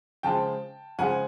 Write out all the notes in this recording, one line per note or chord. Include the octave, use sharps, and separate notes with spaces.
C#3 F3 G#3 G5 A5
C#3 F3 G#3 F#5 G#5